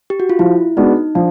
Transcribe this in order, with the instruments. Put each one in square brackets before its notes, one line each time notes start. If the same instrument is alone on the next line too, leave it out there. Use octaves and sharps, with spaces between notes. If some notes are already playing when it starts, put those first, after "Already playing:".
[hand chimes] G4
F#4
F4
[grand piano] F3 [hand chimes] E4
[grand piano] G#3 B3 D4 F#4 [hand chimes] D#4
[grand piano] F3 [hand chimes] D4